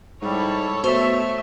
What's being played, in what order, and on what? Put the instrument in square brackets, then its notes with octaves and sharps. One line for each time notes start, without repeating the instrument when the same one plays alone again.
[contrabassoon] G#2 [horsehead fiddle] G3 E4 [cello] A4 C#5
[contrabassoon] B2 [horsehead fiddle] A3 E5 [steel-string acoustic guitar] C5